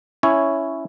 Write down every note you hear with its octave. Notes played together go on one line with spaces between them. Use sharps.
C#4 E4 C#5